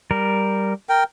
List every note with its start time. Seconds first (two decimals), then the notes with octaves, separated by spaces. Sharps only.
0.11 G3 A#4
0.89 A#4 G5